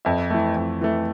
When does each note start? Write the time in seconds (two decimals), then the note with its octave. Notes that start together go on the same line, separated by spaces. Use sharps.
0.05 F2 E5
0.30 E3 A3
0.57 F2
0.81 E3 A3